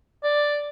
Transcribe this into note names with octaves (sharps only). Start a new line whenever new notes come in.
D5